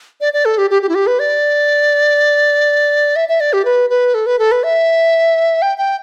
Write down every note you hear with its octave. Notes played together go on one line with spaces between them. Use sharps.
D5
D5
A4
G4
G4
G4
E4
G4
B4
D5
E5
E5
D5
G4
B4
B4
A4
B4
A4
B4
E5
G5
G5